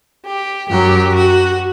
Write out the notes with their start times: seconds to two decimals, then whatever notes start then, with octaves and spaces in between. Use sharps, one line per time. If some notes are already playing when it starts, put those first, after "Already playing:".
0.24 G4
0.68 F#2 F#3 G4
1.14 F#4